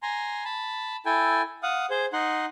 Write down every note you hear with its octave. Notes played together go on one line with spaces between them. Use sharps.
G#5 A#5 C6
A5 B5
E4 A4 G5 G#5
F5 F#5 D#6
G#4 C5
D#4 F#5 C6